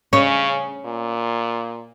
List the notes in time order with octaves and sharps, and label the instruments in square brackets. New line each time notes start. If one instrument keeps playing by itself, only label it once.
[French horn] C#3 [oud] C#4
[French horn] A#2